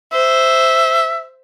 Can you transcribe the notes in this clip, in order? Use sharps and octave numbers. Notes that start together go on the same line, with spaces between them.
C5 E5